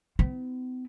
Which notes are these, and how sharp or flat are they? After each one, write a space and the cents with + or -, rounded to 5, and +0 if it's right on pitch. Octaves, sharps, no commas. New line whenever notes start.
B3 +45 E4 -35